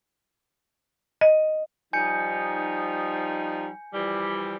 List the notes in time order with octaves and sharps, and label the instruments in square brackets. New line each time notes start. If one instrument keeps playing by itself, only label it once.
[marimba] D#5
[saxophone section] F3 G3 D#4 [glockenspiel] G#5 G6 C#7
[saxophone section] E3 F3 G3